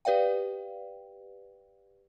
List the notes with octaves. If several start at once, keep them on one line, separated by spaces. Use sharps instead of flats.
G4 B4 D5 F5 G5